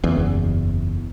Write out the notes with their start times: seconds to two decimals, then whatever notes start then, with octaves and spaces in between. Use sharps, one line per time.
0.03 F#1 E2